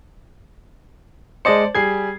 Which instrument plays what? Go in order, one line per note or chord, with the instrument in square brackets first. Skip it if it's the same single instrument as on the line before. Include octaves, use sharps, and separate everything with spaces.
[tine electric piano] G#3 D#5 C#7 [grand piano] C5 D5 A5
[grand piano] G3 G#4 C7 [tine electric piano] G#6